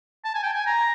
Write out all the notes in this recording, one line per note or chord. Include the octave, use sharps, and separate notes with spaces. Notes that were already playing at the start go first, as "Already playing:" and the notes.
A5
G#5
G5
G#5
A#5